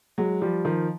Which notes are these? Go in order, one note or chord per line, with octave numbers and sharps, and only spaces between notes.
F#3 G#3
F3 G3
D#3 F3